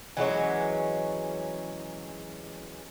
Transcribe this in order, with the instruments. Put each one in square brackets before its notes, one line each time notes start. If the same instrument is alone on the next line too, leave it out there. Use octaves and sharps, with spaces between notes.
[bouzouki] E3 F#3 G#3 C#4